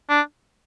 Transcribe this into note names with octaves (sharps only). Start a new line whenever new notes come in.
D4